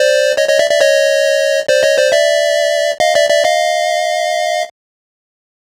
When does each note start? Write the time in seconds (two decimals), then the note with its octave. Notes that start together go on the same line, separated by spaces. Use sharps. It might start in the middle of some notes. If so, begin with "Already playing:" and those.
Already playing: C5 D5
0.37 C#5 D#5
0.48 C#5 D#5
0.59 D5 E5
0.70 D5 E5
0.81 C#5 D#5
1.68 C5 D5
1.83 C#5 D#5
1.98 C5 D5
2.12 D5 E5
3.00 D#5 F5
3.15 D5 E5
3.29 D5 E5
3.44 D#5 F5